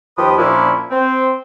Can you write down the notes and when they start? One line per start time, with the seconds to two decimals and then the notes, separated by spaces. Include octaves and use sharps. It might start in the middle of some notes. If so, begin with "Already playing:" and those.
0.17 D#2 F3 G4 B4 D#6
0.37 A#2 F3 A#3 C#4 D4 E4
0.91 C4